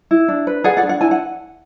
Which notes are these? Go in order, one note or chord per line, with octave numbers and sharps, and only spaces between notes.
E4
D4
B4
G#4 D5 F#5
D5 F#5
D4
F#5
E4 G#5
F#5